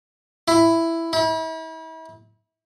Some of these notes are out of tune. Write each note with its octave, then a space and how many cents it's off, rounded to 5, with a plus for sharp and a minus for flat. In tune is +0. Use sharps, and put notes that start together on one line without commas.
E4 +5
E4 -40